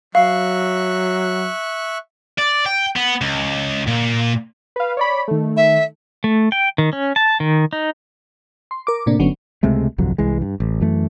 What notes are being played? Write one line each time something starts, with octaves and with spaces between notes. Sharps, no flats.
F#3 E5 F5 C#6 F#6
D5
G5
B3
C#2
A#2
B4 F5
C#5 D5 B5
D#3 A3
E5
A3
G5
D#3
C#4
A5
D#3
D#4
C6
A#4 D6
A2 C3 A#3 D4
G1 D3 F#3 B3 C#4
C#2 C3 G#3 A3
G1 C2 F2 F#3
C2 E3 G#3
G2
A1
F#2 E3 A3